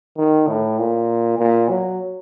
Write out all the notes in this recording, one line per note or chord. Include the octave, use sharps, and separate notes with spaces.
D#3
A2
A#2
A#2
F#3